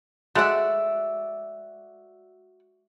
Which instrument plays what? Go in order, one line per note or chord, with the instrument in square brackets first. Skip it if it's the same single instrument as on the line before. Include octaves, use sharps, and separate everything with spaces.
[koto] G#3 [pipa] A3 F#5 [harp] F#4 D5 E5